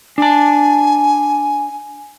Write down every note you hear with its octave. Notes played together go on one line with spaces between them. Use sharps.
D4 G#5 A5